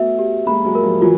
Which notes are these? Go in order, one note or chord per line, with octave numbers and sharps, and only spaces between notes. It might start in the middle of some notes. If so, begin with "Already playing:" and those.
Already playing: A3 B3 F#4 E5
G4
G#3 A#3 B5
F#3 G#3
A#4
F3 G3
E3 F#3 F4